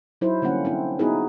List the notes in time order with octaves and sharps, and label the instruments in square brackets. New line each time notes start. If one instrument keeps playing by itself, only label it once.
[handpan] F#3 D#4 E4 C5
D3 G3 A#3 C4 C#4 F#5
C4 D4 E4
B3 D#4 E4 F#4 G#4 B4